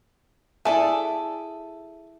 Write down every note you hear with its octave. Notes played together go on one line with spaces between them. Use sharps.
E4 G#4 A4 D5 E5 A5